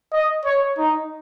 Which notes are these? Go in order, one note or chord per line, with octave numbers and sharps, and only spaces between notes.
D#5
C#5
D#4